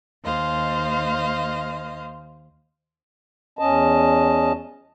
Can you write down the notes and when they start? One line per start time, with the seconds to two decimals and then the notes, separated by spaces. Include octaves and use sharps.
0.23 D#2 C5 D#5 F5
3.59 E2 C#4 D#5 A5